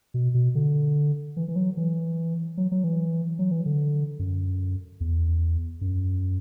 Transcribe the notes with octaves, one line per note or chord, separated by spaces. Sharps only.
B2
B2
D3
E3
E3
F#3
E3
F#3
F#3
E3
F#3
E3
D3
F#2
E2
F#2